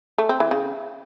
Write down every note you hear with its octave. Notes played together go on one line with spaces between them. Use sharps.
A3
C4
E3
C#3